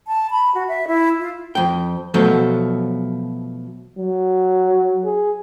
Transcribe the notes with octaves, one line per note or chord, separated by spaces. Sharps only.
A5
B5
F#4
E5
E4
F4
F2 G5
B2 F3 F#3 A3
F#3
G#4